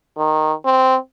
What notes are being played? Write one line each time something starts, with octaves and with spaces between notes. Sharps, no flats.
D#3
C4